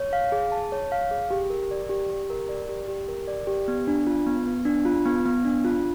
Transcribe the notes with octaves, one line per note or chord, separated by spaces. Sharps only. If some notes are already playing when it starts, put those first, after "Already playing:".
Already playing: C#5
F5
G#4
A5
C#5
F5
G#4
G4
A#4
D5
G4
G4
A#4
D5
G4
G4
A#4
D5
G4
B3
D4
F4
B3
B3
D4
F4
B3
B3
D4
F4